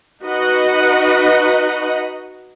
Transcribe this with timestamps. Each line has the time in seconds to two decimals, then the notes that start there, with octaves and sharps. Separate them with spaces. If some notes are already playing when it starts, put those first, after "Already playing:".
0.22 D#4 F#4 B4 D#5 F#5